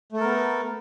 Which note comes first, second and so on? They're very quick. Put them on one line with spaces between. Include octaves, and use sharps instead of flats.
A3 A4 A#4 B3